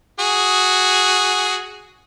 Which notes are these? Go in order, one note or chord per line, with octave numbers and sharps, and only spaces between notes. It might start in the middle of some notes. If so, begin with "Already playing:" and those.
F#4 G#4